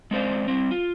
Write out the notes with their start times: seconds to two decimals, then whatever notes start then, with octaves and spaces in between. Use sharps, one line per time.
0.11 G#3 C4 D4 C5 D5 F5
0.48 G3 C4
0.71 F4